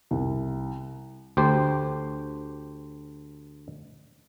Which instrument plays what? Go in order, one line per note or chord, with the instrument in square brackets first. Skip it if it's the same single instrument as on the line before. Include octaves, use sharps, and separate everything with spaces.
[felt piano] C2
[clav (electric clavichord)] D2 G4 C5